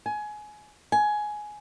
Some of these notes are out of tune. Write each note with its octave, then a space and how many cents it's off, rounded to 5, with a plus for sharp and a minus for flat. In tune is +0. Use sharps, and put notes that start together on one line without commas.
G#5 +20
G#5 +15